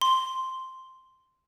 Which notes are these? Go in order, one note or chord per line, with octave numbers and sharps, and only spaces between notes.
C6